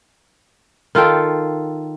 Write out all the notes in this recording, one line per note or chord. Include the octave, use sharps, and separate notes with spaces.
D#3 F4 A4 G5